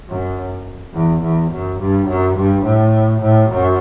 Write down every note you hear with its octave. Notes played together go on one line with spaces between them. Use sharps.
F#2
E2
E2
F#2
G2
F#2
G2
A2
A2
F#2